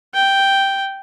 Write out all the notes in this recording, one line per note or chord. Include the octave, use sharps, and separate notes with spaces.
G5